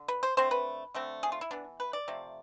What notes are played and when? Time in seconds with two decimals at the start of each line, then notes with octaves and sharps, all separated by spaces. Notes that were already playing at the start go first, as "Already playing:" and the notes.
Already playing: D3
0.08 B4
0.23 C5
0.37 D3 A3 C4 C5
0.51 B4
0.94 D3 A3 C4
1.23 G#4
1.32 F4
1.41 E4
1.51 E3 B3 D4
1.80 B4
1.93 D5
2.08 C3 F3 A3